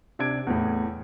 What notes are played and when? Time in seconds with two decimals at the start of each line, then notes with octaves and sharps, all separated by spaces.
0.19 C3 D4 G#6 D7
0.47 E2 A2